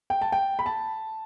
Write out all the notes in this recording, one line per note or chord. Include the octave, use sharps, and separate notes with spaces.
G5
A5
G5
B5
A5